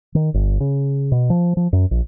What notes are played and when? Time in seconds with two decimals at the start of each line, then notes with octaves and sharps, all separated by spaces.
0.15 D#3
0.34 G1
0.60 C#3
1.12 B2
1.30 F3
1.57 F3
1.73 F#2
1.91 A#1